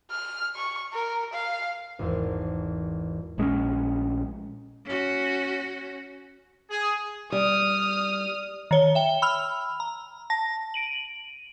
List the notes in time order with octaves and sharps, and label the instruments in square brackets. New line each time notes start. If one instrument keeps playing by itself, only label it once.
[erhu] F6
C#6
A#4
F5
[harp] G#1 E2
[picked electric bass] A#1 G#3 C4 C#4
[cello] C#4 F#4
[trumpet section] G#4
[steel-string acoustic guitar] G3 [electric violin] D#6 F6
[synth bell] D#3 C#5 G7
E5 G5 G7
B5 E6 F6 F7
A#5
A5 A#6
D7 D#7 F#7